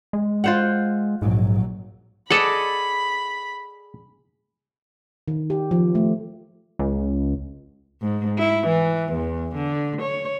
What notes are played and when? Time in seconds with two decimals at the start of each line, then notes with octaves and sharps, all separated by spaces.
0.13 G#3
0.44 F4 C5 F#5
1.22 A#1 G#2 F#3
2.31 G#4 A4 D5 D#5 F#5 B5
5.28 D#3
5.50 G4
5.71 F3
5.95 A3
6.79 C#2
8.02 G#2
8.38 E4
8.67 E3
9.13 E2
9.56 D3
10.02 C#5